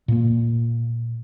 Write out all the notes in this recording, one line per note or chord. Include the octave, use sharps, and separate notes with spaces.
A#2 A#3